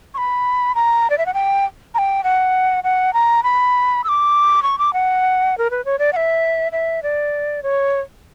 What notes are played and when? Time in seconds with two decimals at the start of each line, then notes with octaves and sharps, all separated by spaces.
0.14 C#6
0.18 B5
0.75 A#5
1.10 D5
1.18 E5
1.26 F#5
1.34 G5
1.94 A#5
1.98 G5
2.24 F#5
2.84 F#5
3.13 A#5
3.43 B5
4.04 E6
4.09 D6
4.63 C#6
4.78 D6
4.93 F#5
5.58 A#4
5.71 B4
5.85 C#5
5.99 D5
6.13 F#5
6.16 E5
6.72 E5
7.03 D5
7.63 C#5